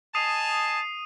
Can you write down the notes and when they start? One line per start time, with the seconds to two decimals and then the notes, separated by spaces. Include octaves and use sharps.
0.15 D#5 G#5 A5 D#6 C7 D#7